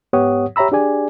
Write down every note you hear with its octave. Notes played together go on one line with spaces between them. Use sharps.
G#2 B3 G4 C#5 F#5 D#6
G4 C#5 E5 A#5 B5 E6
D4 G4 G#4 D5 G#5